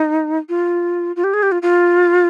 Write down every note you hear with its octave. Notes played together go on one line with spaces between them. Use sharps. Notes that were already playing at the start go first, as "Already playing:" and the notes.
Already playing: D#4
F4
F4
G4
G#4
G4
F4
F4